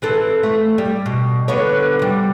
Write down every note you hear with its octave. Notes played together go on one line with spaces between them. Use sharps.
E3 C4 A4
A3
G3
B2
D3 B3 C#5
C3 G3